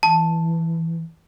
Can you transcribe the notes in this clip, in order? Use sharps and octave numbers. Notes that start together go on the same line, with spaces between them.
E3 A5